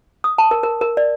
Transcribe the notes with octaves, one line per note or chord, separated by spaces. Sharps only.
D#6
A5
A#4
A#4
A#4
D5